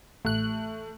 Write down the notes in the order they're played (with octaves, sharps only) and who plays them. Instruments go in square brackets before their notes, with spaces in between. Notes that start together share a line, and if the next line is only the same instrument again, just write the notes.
[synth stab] A1 F#6 [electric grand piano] A3